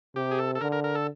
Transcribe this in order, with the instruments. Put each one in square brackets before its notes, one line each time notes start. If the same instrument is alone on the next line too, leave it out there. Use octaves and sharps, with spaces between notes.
[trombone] C3 [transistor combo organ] G4
[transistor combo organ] G#4
A4
A4
[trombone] D3 [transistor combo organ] A#4
[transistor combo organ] A#4
A#4
A4